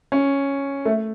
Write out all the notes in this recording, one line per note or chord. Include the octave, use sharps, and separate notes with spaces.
C#4
A3